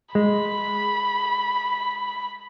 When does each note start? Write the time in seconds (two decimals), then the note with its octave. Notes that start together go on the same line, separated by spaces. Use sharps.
0.15 G#3 B5